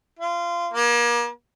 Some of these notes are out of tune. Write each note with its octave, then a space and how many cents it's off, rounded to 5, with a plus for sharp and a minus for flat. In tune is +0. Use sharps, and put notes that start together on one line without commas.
F4 -20
A#3 +35